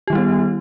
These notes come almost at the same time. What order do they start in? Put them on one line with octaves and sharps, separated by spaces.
G4 D#3 G3 E4 B3